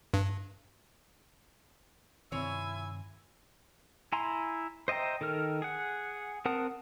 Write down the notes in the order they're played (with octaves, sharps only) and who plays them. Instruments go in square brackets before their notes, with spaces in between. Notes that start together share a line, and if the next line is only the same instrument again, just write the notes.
[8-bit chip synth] G2
[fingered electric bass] G2 C3 D#3 [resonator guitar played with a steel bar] C4 C#5 [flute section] E4 E6 [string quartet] G#5
[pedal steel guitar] E4 G#5 A#5 C6
C5 D#5 E5 G5 A#5
D#3 A4 A#4 F6
G#4 F#5
C4 A#4 F#5 A5 D#6